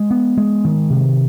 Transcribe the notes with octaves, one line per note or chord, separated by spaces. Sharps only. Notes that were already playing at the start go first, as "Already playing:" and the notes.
Already playing: G#3
B3
G#3
D#3
C3